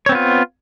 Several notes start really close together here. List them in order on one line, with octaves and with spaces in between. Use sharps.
C#5 C4 B3 F4